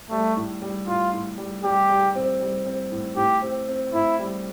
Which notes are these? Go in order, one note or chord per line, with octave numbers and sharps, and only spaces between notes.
G3 A3
A2
G3
A2 F4
A2
G3
G3 G4
G3
C4
G3
C4
A2
A2 G4
C4
C4
A2 E4
G3